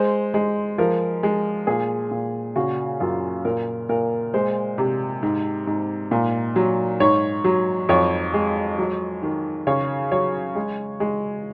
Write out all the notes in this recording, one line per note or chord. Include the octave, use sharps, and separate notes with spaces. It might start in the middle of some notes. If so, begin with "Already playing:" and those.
Already playing: G#3 C5
G#3
F3 A#4
G#3
A#2 G#4
A#2
C#3 F#4
F#2 F4
A#2 A#4
A#2 A#4
G#3 C5
C3
G#2
G#2
A#2
F#3
G#2 C#5
F#3
F2 C#5
G#3
F#3
D#3
C#3 C#5
F#3 C#5
G#3
G#3